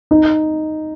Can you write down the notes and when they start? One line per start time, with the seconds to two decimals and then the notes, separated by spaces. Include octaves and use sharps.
0.11 D#4